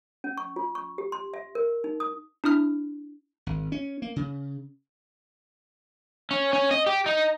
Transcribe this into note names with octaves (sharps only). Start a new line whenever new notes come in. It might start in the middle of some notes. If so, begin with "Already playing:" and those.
C#4
C#6
F4
C#6
G4
C6
E5
A#4
D#4
D#6
D4 E4 D#6 F6
G#1
C#4
A#3
C#3
C#4
C#4
D#5
G4
D#4